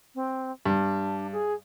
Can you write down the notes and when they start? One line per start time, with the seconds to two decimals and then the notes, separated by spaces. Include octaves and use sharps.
0.15 C4
0.66 G2 D4
1.32 G#4